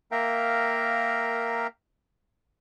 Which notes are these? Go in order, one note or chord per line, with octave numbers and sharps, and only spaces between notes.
A#3 A#4 E5 F5 G5 A#5